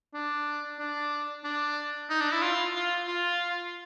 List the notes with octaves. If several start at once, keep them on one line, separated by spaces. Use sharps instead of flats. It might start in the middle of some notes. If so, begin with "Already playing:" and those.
D4
D4
D4
D#4
D4
E4
F4
F4
F4